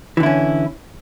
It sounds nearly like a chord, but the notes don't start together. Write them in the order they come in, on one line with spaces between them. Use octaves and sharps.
E3 D3 E4 C#4